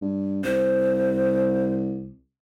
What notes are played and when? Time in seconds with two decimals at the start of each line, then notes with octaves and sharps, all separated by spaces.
0.02 G2
0.44 C2 C5